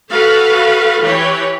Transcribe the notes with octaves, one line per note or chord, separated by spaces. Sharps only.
F#4 A4 B4 F5
E3 G4 B4 C#5